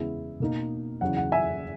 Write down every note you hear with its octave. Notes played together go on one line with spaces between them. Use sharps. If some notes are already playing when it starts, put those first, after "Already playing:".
Already playing: E2 C#3 G#3 B3 E4
B2 A#3 D#4
E2 C#3 F#3 F#5
F#5
E5 G#5